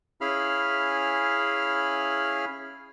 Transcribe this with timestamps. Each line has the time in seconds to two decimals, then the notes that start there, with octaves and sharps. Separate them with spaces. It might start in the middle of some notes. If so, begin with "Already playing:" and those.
0.21 C#4 E4 G#4 F5 B5 F6